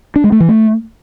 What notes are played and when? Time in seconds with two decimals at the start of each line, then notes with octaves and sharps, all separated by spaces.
0.16 D4
0.24 G#3
0.32 A3
0.40 E3
0.49 A3